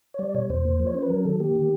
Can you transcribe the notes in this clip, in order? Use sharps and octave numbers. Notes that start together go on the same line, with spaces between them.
C#5
G3 D5
D5
B2 C#5
E2 C5
A#3
F3
C#5
C#4 C5
B4
F#3 A#4
D#3 A4
A#3 G4
D#3